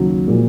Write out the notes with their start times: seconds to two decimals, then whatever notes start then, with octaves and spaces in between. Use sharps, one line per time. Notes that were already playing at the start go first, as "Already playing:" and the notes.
Already playing: D#2 C#3 F#3
0.27 A#2 F3 G#3